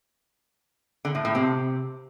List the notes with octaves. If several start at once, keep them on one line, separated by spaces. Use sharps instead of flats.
D3
A2
A2
C3